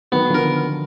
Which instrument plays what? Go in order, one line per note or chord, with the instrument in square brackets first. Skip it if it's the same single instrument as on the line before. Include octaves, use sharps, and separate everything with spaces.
[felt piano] D#3 F#3 [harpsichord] B3
[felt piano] D3 F3
[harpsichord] A#4